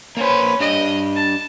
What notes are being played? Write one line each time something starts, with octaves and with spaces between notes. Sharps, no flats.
A#3 C#4 B4 C5
D4 G4 D#5
A5